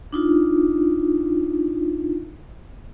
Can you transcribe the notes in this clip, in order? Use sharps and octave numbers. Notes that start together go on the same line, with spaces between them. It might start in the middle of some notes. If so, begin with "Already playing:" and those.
D4 D#4 F4